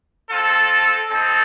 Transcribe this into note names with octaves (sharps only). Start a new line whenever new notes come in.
C4 F4 A4
C4 D#4 A4